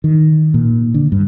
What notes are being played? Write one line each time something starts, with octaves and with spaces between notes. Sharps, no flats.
D#3
A#2
D3
G2